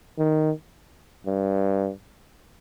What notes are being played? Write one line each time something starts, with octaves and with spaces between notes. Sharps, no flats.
D#3
G2